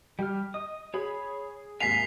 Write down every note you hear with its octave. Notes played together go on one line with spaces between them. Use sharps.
G3 G4 F6
D#5 D#6
G#4 C#5 B5
D#2 G#2 C3 E5 G#5 B6 C7 F7